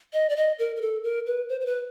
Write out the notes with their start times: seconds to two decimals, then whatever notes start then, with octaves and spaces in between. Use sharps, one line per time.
0.13 D#5
0.29 D5
0.36 D#5
0.59 A#4
0.76 A#4
0.81 A4
1.04 A#4
1.26 B4
1.49 C5
1.61 C5
1.66 B4